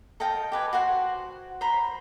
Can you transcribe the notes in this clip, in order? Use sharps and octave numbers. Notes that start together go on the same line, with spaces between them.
A4 D#5 F5 G5
G4 B4 G#5
F#4 C5 F#5 C6
C5 A#5 B5